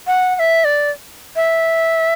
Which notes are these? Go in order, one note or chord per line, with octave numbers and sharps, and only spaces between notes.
F#5
F#5
E5
D5
E5